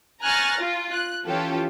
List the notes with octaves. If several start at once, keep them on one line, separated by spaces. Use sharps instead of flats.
G#5 A#5 C#6 F6 F#6 A6
F4
F#6
E3 C#4 F4 G4 A4